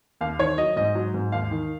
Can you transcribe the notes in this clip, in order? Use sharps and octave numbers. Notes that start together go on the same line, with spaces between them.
D#2 F5
D#3 C#5
F#3 D#5
G#2 D#5
F#3
G#2
D#2 F5
D#3